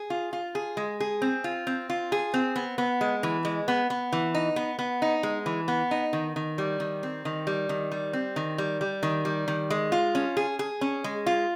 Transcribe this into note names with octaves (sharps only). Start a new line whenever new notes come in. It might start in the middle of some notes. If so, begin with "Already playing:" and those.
Already playing: G#4
F4
F4
G#4
G#3
G#4
C4
F4
C4
F4
G#4
C4
B3
B3
G#3
E3
G#3
B3
B3
E3
D#4
B3
B3
D#4
G#3
E3
B3
D#4
D#3
D#3
G3
D#3
C4
D#3
G3
D#3
G3
C4
D#3
G3
G3
D#3
G3
D#3
G#3
F4
C#4
G#4
G#4
C#4
G#3
F4